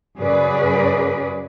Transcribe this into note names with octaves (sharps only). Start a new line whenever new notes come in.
F#2 C#3 F#3 G#4 B4 D5